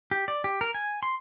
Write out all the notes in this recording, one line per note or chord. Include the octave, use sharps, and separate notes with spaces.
G4
D5
G4
A#4
G#5
C6